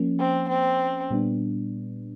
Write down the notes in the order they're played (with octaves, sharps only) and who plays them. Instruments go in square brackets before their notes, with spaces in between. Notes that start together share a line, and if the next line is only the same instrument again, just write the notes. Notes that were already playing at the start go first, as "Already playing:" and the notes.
Already playing: [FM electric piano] F3 A#3 C#4
[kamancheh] C4
C4
[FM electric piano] A#2 G3 B3 D4